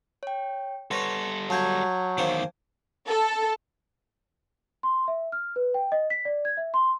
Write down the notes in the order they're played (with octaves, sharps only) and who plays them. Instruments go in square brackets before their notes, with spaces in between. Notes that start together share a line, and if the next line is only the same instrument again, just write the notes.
[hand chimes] C#5 G5
[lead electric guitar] G3 A4 [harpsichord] B4 C#5 [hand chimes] F#5 C6 A#6
[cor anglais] F#3 [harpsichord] F#4 F5 [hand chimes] A5 G6 G#6
[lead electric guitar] E2 D#3 [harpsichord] A#3 C5 D6
[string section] A4
[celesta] C6
E5
F6
B4
G5
D#5
B6
D5
G#6
E5
C6